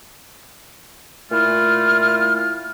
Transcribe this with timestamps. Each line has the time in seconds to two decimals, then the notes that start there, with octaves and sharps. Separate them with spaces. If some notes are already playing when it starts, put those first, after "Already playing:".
1.32 A#2 A3 E4 F4 F6